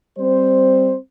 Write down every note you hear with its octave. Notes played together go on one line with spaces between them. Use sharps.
G3 C4 C5